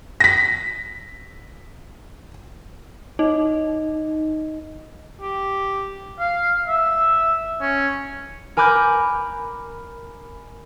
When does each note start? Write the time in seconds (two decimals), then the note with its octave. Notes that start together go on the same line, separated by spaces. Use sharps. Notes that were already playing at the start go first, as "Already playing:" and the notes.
0.20 A#6 B6
3.19 D#4 D#5
5.21 G4
6.19 F5
6.68 E5
7.61 C#4
8.57 A#4 G#5 B5 D6 F#6 G6